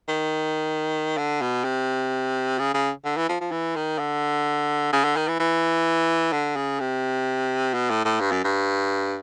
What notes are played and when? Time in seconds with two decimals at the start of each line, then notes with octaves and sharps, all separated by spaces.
0.09 D#3
1.18 D3
1.41 B2
1.64 C3
2.59 C#3
2.74 C#3
3.05 D3
3.17 E3
3.29 F3
3.41 F3
3.51 E3
3.76 D#3
3.99 D3
4.93 C#3
5.04 D3
5.17 D#3
5.28 E3
5.40 E3
6.33 D3
6.56 C#3
6.80 C3
7.74 B2
7.90 A2
8.05 A2
8.20 G2
8.32 F#2
8.44 G2